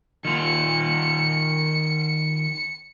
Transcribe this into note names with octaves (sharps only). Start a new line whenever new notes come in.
D#3 F4 C#7